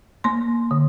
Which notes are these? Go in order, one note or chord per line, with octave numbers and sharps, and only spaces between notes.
A#3 C6
D3